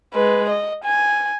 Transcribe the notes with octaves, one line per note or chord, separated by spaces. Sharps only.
G#3 B4
D#5
G#5